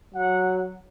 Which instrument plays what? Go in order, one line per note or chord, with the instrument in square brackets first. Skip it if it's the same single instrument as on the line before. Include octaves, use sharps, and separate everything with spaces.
[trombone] F#3 [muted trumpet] F#5